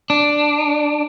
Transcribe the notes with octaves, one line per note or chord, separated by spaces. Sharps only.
D4